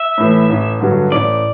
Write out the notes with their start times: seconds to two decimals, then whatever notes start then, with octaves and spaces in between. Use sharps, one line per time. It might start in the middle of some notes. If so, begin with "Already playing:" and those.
Already playing: E5
0.18 A2 E3
0.49 A1
0.81 G2 D3 F#3
1.11 A1 D5